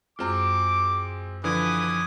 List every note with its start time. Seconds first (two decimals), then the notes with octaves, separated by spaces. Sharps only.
0.19 F#2 G#3 C4 F4 D6
1.44 D3 E3 F3 B4 G#5 D6 D#6